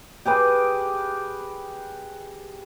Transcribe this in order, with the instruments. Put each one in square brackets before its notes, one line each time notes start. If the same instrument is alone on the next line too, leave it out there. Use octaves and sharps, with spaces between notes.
[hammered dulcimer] G4 G#4 B4 G5